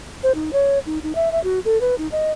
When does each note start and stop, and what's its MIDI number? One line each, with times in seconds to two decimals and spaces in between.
0.23 0.35 72
0.35 0.50 63
0.53 0.79 73
0.86 0.99 63
1.03 1.15 63
1.15 1.29 76
1.32 1.42 76
1.44 1.60 66
1.65 1.80 69
1.81 1.95 71
1.98 2.08 63
2.12 2.31 75